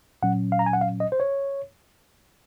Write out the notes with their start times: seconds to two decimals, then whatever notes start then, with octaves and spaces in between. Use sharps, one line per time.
0.22 A#2 F#3 C#4 F#5
0.52 F5
0.59 A#5
0.66 G#5
0.73 F#5
0.81 F5
1.00 D#5
1.12 C5
1.20 C#5